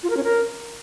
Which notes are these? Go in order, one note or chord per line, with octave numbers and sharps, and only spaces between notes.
F4
A#4
C#4
A#4